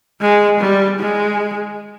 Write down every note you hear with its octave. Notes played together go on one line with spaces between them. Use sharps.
G#3
G3
G#3